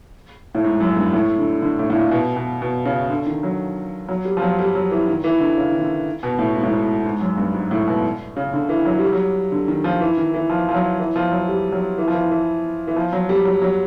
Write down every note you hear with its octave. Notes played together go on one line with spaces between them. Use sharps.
A2
G#2
F#2
G2
A2
D3
D3
A2
A2
A#2
B2
B2
B2
C#3
D3
D#3
F#3
F#3
G3
F3
F#3
G3
F#3
E3
D#3
E3
D3
C#3
D#3
D3
B2
A2
G#2
A2
G#2
G#2
F#2
G2
G#2
A2
B2
C#3
D3
E3
F#3
G3
F#3
D3
D#3
F3
E3
D#3
E3
F3
F3
F#3
E3
F3
F#3
G3
F#3
E3
F3
E3
E3
E3
F3
F#3
G3
F#3
F#3